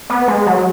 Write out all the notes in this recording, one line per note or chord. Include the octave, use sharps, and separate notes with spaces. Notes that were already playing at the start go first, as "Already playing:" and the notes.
B3
G#3
F#3